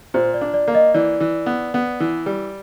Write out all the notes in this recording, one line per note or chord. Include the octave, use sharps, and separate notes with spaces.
A#2 C5
D5
D4
D5
A#3
D#5
E3 D5
E3
B3
B3
E3
G3